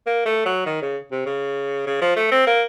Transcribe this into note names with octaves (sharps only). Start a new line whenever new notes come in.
A#3
A3
F#3
D#3
C#3
C3
C#3
C#3
F3
A3
C4
A#3